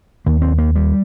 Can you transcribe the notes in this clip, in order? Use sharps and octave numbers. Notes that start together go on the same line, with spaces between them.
D#2 A#3
C4
A#3
G3